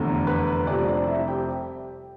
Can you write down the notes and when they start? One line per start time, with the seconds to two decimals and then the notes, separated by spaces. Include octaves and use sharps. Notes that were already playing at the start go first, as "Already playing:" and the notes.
Already playing: F1 E2 D3
0.27 B4
0.67 F1 F2 C3 G3 D4 D5
0.87 D4 D5
1.07 E4 E5
1.28 G4 G5